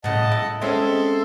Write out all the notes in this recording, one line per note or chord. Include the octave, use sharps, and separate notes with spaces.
A2 C#3 D#5 F#5 A5
E4
G#3 C4 C#4 A4 E5 C6